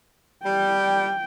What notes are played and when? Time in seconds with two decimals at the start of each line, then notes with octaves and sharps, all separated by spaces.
0.46 G3 G5